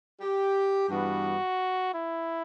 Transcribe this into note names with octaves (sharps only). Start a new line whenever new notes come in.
G4
G2 E3 G3 B3 F#4
E4